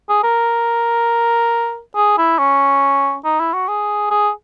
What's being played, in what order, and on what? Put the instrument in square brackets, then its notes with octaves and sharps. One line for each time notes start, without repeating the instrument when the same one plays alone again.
[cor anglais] G#4
A#4
G#4
E4
C#4
D#4
E4
F#4
G#4
G#4